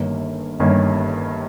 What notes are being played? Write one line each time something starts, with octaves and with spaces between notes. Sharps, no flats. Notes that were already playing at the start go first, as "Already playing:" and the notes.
Already playing: G1 G2 D#3 A#3 C#4
G1 G2 D#3 A#3 C#4